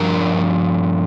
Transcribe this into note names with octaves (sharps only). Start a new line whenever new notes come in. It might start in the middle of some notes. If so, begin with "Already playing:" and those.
Already playing: G2 F3 D4 A#4